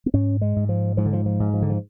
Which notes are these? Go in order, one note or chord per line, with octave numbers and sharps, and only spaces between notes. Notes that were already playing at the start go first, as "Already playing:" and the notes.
B3
G#2 C#4
G#3
G#2
F3
G#2 F3
D3
F3
F3
G#2
F3
D3
F3